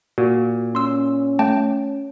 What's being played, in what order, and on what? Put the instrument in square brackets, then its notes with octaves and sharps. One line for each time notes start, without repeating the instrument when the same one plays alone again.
[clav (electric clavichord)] A#2 [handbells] F#4
[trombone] C#4 [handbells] C6 E6
[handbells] A3 G5 A5